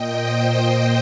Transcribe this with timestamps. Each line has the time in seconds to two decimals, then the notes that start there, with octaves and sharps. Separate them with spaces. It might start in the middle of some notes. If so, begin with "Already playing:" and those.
Already playing: A#2 D#5 G5
0.22 C5 D#5